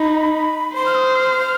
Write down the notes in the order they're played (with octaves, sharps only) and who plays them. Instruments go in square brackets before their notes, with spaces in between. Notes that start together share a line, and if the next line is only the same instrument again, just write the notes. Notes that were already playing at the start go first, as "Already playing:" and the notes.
Already playing: [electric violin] D#4 [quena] B5
[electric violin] C5 [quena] C6
[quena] F6
D#6
F6